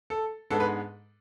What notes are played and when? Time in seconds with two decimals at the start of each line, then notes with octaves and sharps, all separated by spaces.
0.10 A4
0.50 G#2 G#3 B3 D4 A4
0.60 B4